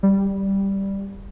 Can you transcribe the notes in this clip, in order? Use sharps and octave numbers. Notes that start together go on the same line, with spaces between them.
G3